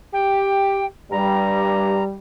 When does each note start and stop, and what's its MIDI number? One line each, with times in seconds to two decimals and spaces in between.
0.13 0.85 67
0.13 0.86 79
1.12 2.00 43
1.12 2.16 55
1.12 2.03 82